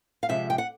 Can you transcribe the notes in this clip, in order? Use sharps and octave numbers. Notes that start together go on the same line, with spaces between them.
F5
C3 F3 G#3 E5
G5
F#5